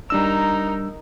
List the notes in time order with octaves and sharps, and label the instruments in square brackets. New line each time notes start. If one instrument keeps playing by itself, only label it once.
[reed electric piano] G3 D4 E6 [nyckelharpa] D#4 A#4